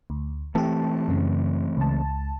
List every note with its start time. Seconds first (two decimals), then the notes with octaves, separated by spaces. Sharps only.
0.10 D2
0.55 E3 A3 C4 G4 A5
1.08 F#2 C#3
1.77 C#2 A5